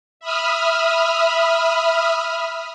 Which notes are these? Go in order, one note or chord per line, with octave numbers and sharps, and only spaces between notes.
E5 B5 D#6 F6